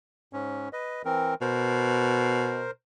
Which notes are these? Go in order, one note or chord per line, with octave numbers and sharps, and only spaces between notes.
G#2 C#4
B4 D#5
E3 C4 A#4
B2 A#4 C5